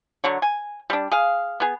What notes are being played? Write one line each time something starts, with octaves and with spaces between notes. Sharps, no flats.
D3 F#3 C#5
G#5
G3 D4
G#4 F5
B3 G#4